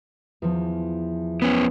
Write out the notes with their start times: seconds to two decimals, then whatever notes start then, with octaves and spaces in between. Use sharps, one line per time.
0.42 E2 F3
1.42 B3 C#4